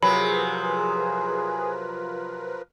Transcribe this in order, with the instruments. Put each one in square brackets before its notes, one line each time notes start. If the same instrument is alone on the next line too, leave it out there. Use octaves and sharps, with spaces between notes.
[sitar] C3 F#3 [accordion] F3 A#4 B4 [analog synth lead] G#4 [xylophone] B5